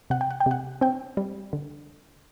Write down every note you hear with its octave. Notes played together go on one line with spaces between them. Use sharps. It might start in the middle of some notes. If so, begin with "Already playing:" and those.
C3 F#5
G5
F#5
G5
C3 F#5
C4 G5
G3
D3